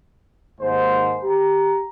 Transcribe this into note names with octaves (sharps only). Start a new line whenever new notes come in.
D#2 G#2 C5
G4 A#5